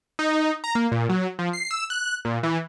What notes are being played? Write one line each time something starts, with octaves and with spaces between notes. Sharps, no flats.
D#4
A#5
A#3
A#2
F#3
F3
C7
E6
F#6
A#2
E3